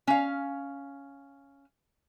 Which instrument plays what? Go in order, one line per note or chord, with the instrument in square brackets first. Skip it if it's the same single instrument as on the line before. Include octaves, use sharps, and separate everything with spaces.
[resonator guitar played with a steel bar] C#4 F5